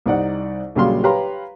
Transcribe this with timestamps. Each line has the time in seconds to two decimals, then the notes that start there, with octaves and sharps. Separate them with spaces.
0.06 C2 D#4 D5 F#5
0.75 A#1 C#3 F#3 G3 F5 C6
1.03 G4 B4 C#5 F5 A#5 C6